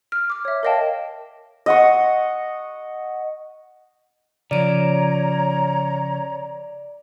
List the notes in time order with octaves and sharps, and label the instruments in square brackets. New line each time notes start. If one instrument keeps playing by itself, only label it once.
[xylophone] F6
D6 F6
C#5 E5
A#4 C#5 D#5 F5 G5 A5
[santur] D#5 F#5 C#6
[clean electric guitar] C#3 F3 [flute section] C#5 A#5 [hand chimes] D5 D7